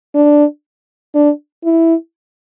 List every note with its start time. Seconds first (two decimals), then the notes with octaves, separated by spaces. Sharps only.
0.15 D4
1.15 D4
1.65 E4